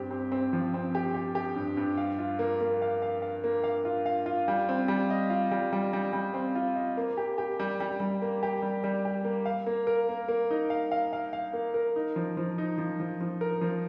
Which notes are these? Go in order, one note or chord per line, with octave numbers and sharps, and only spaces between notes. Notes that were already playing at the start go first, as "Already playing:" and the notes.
Already playing: G2 C4 G4
C4
C4
F3
C4
G4
G4
G4
G2
G2
F5
F4
A#3
A#3
F5
F5
F5
A#3
F5
F4
F5
F4
G3
C4
G3
D#5
F4
G3
G3
G3
G3
C4
F4
D#5
A#3
G4
G4
G3
G3
G3
A#3
G4
G3
G3
G4
A#3
F5
A#3
A#4
A#3
A#3
D#4
F5
F5
F5
F5
A#3
A#4
D#4
F3
F3
D#4
F3
F3
F3
A#4
F3